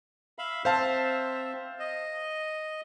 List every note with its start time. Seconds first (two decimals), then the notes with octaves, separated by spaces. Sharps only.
0.39 E5 F5 B5
0.65 C4 C5 E5 F5 A5
1.79 D#5